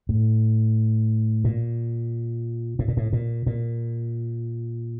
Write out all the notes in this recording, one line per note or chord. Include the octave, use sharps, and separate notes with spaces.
A2
A#2
A2
A#2
A2
A#2
A#2